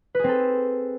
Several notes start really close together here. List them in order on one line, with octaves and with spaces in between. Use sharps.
B4 G#4 C4 A4